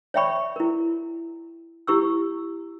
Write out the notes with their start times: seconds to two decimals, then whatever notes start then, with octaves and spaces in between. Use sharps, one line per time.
0.14 C#5 D5 E5 G5 B5 C#6
0.56 E4 A#4
1.87 E4 G4 C#6 E6